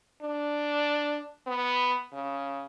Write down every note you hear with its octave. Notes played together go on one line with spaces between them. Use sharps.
D4
B3
C#3